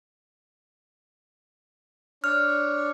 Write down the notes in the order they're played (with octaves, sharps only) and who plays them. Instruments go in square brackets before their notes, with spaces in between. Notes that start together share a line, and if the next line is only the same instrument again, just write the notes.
[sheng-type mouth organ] D4 C#5 [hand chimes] F6